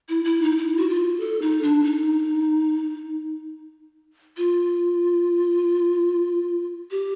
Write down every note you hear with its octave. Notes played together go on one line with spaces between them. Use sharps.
E4
E4
D#4
E4
F#4
F4
A4
D#4
D4
D#4
F4
G4